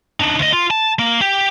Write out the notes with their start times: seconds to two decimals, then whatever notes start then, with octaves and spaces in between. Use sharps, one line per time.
0.20 D4 D#4
0.39 D2 D#5
0.53 F4
0.71 A5
0.99 A#3
1.21 G4